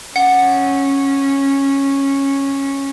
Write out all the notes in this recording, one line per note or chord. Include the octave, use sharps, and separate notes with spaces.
C#4 F#5